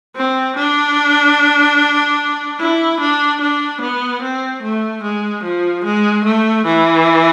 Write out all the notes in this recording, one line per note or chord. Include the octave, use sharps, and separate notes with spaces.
C4
D4
E4
D4
D4
B3
C4
A3
G#3
F3
G#3
A3
E3